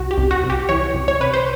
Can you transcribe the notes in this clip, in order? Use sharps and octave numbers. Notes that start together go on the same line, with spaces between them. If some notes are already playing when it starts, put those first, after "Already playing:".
Already playing: C2 F#4
G4
C2
F#4
C2
G4
E3 C#5
C2
C#5
C3 B4
C5